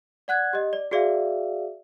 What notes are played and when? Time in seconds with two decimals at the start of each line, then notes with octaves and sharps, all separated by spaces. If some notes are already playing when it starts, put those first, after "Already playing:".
0.28 D5 F#5 F#6 G#6
0.53 G4 D#5
0.73 D5
0.91 F#4 G#4 D5 E5 F5